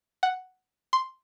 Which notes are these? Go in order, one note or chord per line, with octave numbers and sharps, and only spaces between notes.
F#5
C6